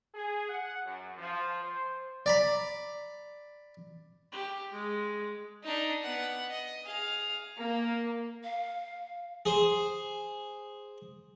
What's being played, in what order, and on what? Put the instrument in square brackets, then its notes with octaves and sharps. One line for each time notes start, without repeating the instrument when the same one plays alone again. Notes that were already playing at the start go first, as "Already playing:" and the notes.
[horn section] G#4
F#5
F#2
F3
C5
[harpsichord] D5 A#5 B5
[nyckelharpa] G4
G#3
[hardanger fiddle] D4 D#4
B3 F#5
D#5
G#4 F5
[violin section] A#3
[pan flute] F5
[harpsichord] G#4 C5